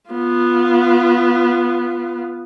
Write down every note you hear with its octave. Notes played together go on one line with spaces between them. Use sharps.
B3 F4